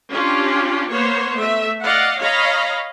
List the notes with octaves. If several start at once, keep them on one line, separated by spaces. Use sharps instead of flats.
C#4 D4 F4 G4
A#3 B3 C5 C#5
A3 E5
D5 D#5 F5 F#5
C#5 D#5 F5 A#5 B5